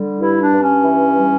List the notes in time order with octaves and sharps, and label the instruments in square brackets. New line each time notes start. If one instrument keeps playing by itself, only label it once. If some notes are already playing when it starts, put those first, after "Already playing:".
Already playing: [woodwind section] D3 G3
G2 E4
D4
G2
C#4
E3
G3